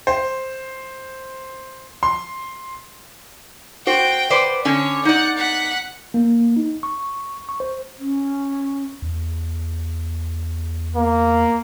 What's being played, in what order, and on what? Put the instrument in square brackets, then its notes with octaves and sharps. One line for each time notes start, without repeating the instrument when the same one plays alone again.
[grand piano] C5
C6
[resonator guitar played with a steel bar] F#4 C5 [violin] G5
[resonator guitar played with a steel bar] B4 C5 D5
[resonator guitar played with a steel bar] D3 C#4 [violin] C#5
[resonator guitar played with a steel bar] D#4 D5 [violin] F#5
[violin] F#5 B6
[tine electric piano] A#3
D#4
C#6
C#6
C5
[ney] C#4
[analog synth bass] E2
[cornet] A#3